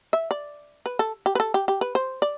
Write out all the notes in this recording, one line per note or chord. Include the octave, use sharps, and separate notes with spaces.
E5
D5
B4
A4
G4
B4
A4
G4
G4
B4
C5
D5